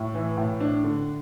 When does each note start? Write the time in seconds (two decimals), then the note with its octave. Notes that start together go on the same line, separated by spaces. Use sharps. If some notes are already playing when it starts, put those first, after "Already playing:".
Already playing: A2
0.14 E3
0.37 A2
0.60 D4
0.84 D3